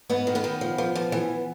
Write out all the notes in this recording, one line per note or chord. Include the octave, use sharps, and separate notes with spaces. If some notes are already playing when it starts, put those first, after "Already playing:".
G#2 B3 B4
D#3
B3 B4
D#3
F3
F3
F3
E3